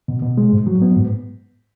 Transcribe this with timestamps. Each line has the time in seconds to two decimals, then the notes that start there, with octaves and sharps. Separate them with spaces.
0.08 B2
0.22 B2
0.38 G#3
0.52 G#2
0.67 F#3
0.82 B3
0.96 G#2